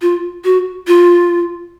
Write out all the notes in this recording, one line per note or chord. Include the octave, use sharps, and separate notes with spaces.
F4
F#4
F4